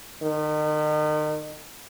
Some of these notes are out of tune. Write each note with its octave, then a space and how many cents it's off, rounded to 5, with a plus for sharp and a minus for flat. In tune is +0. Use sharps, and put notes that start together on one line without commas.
D#3 -35